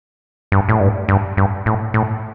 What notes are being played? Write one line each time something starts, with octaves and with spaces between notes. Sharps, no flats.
G2
A2
G2
G2
G2
A2
A2